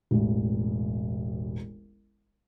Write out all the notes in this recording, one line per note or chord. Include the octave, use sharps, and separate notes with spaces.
E1 A1